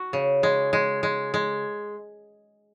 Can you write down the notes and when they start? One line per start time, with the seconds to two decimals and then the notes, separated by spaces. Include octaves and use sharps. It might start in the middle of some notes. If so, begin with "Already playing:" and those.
Already playing: F#4
0.13 C#3
0.43 G#3
0.73 G#3
1.03 G#3
1.34 G#3